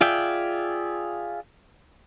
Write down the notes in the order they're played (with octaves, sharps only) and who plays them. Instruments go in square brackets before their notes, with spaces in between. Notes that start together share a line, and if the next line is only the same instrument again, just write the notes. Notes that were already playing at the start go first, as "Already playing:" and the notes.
[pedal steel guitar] F4 G#4 D5 E5 G5